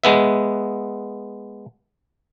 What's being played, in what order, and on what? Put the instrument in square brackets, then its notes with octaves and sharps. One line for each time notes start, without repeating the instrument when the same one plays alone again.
[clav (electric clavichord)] G#3 B3 E5